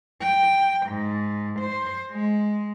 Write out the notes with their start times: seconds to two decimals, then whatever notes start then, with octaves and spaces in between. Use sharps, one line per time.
0.21 G5
0.87 G#2
1.60 C5
2.12 G#3